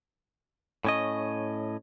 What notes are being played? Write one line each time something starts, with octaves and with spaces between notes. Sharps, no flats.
A2 C#4 D#5